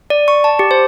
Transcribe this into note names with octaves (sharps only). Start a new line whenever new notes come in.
D5
C#6
A5
G4
C5